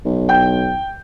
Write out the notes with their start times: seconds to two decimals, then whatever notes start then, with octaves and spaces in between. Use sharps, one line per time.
0.05 B1
0.29 G5 G6